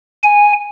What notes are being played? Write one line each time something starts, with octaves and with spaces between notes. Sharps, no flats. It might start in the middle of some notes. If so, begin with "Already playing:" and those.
G#5